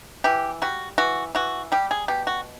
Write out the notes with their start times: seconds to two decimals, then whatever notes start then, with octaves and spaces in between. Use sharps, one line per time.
0.24 E3 G4
0.62 G3 F#4
0.98 E3 F#4
1.35 E3 F#4
1.72 G3 G4
1.91 G#4
2.08 B2 G4
2.27 F#4